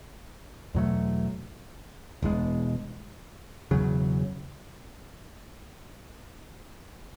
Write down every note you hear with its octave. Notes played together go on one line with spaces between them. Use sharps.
E2 B2 F#3 A3
E1 E2 B2 G#3
E1 E2 C#3 F#3